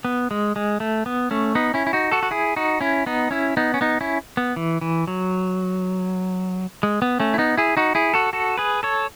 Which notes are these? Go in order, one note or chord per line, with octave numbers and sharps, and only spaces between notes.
B3
G#3
G#3
A3
B3
A3 C#4
B3 D#4
C#4 E4
E4
D#4 F#4
F#4 A4
F#4
E4 G#4
D#4 F#4
C#4 E4
B3 D#4
C#4 E4
B3 D#4
C#4
B3 D#4
C#4 E4
B3
E3
E3
F#3
G#3
B3
A3 C#4
E4
B3 D#4
E4 G#4
D#4 F#4
E4 G#4
F#4 A4
F#4 A4
G#4 B4
A4 C#5